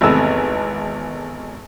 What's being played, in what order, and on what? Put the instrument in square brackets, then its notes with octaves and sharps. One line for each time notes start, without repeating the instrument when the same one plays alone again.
[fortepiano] G#1 E2 C3 A3 B3 E6